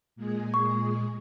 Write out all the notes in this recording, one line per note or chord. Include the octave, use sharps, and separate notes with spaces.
A#2 G#3 G#4
C#6